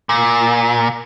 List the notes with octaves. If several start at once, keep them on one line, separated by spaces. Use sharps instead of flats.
A#2